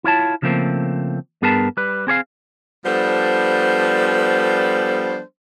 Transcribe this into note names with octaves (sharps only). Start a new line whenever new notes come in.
E4 F4 C#5 A5
C#3 F3 A3 A#3 C4
G2 B3 G#4 A#4 B4 A5
G3 B4
C4 G#4 C#5 F5
F3 G3 B3 D4 A4 C5